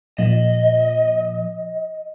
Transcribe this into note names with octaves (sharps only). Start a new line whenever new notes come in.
A#2 F3 D#5